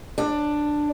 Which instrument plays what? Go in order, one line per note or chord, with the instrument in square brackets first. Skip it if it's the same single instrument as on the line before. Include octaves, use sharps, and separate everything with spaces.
[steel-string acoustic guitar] D4